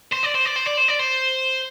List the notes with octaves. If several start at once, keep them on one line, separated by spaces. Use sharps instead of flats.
C5
D5
C5
D5
C5
D5
C5
D5
C5